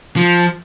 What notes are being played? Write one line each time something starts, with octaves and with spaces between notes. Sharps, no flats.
F3